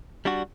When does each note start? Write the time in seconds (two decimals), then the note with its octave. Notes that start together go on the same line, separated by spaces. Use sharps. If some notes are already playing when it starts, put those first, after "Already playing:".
0.25 G3 D4 F#4